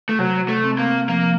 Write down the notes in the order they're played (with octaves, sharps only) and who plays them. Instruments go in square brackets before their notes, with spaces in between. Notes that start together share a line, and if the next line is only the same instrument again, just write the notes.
[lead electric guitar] A3
[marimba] C3 [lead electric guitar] F#3
[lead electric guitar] A3
[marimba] C4
[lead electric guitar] A#3
[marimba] F3 [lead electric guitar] A#3